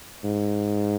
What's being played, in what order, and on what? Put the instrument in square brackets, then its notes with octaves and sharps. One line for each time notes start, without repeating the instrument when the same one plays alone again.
[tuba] G#2